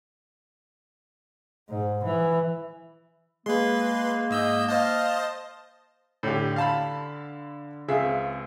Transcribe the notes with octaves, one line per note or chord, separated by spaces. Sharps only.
G#2
E3
G#3 A#3 B4 C6
G#2 D#5 E6 G6
C5 D#5 F5 A5
A2 D3 G4
F5 A5 B5
C#2 C4 F4 G#4 E5